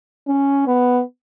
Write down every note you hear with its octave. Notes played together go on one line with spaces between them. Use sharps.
C#4
B3